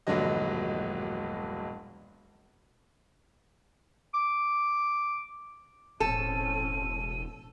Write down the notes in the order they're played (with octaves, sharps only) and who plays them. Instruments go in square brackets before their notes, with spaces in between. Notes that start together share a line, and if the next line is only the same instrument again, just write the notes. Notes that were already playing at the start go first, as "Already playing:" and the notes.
[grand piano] E1 A#1 G2 D3 F#3 D#5
[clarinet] D6
[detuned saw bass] E1 [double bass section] A2 C4 C#4 [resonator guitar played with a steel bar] A4 [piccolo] D#7